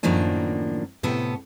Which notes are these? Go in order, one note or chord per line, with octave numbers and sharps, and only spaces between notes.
F#2 A2 D#3 F3 A#3 D4
A2 C3 B3 A4